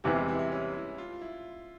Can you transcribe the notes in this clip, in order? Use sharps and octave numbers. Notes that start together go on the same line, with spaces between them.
E2 C3 E3 G3
G#3
E4
E4
C#4
E4
F4
E4